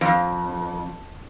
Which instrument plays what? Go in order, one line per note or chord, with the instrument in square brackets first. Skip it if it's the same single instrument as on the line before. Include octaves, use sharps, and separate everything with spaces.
[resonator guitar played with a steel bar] F2